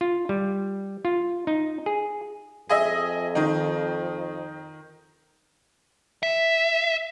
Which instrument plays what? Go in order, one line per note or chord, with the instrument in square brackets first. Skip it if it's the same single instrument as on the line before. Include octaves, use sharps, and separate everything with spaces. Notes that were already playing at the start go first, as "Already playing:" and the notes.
[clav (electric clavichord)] F4
G3
F4
D#4
G#4
[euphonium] F2 [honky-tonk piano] G#4 D#5 E5
[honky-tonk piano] D#3 D#4
[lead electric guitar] E5